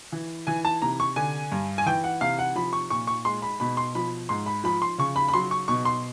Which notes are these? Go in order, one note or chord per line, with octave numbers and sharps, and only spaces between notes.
E3
E3 G#5
A5
C3 A#5
C#6
D3 G#5
G2
G#5
E3 G5
F#5
C3 F5
F#5
F3 B5
C#6
A#2 C#6
C#6
G#3 C6
B5
B2 B5
C6
F3 B5
G#2 C6
B5
F3 B5
C6
C#3 C#6
B5
B5
F#3 C6
C#6
B2 C#6
C6